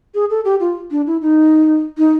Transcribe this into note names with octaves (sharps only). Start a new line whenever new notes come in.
G#4
A4
G4
F4
D4
E4
D#4
D#4